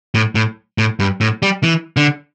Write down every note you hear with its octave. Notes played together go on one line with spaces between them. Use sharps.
A2
A2
A2
G2
A2
G3
E3
D3